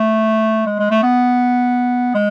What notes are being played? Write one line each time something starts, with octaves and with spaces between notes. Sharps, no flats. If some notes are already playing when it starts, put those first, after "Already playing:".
Already playing: A3
G#3
G#3
A3
B3
G#3